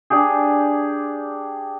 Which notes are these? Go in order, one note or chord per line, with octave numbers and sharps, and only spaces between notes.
D4 G4 G#4